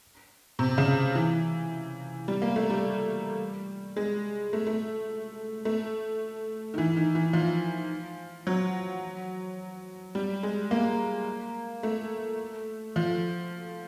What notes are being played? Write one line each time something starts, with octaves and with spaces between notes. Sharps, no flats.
C3
C#3
E3
G3
A#3
A3
G3
G#3
A3
A3
A3
D#3
E3
D#3
E3
F3
F#3
G3
G#3
A#3
A3
F3